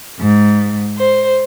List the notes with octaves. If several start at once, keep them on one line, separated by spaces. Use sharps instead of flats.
G#2
C5